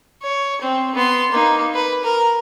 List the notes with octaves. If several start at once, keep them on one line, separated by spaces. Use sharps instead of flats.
C#5
C4
B3 C6
A#3 D#4
B4
A#4